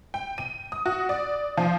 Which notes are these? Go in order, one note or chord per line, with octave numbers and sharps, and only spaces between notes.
G5
D#7
D#6
F#4
D5
F3